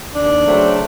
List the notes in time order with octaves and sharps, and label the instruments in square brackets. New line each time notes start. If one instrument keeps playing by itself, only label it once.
[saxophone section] D#2 D4
C#3 F#3 A3 C4